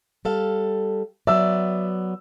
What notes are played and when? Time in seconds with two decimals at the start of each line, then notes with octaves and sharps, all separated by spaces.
0.25 G3 A4 F5
1.27 F#3 B3 D5 E5 E6